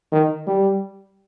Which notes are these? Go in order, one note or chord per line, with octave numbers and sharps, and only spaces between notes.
D#3
G3